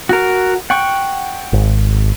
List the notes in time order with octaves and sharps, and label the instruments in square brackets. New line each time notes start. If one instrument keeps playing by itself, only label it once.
[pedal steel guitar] F#4 A#4
F#5 G5 C#6
[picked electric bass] G#1